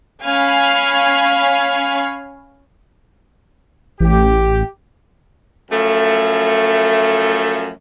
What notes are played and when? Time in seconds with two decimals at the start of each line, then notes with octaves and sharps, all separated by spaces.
0.23 C#4 C#5 F5 G#5 B5
4.00 A1 G4
5.71 F#2 F3 A3